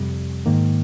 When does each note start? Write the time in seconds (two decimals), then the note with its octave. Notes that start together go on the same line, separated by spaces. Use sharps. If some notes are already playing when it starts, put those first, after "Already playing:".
Already playing: F2 C3 G3
0.46 G#2 D#3 A#3